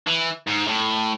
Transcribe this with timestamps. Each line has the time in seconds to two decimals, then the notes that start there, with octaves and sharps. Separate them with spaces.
0.07 E3
0.47 G#2
0.67 A2